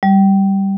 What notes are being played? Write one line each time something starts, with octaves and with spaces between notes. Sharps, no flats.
G3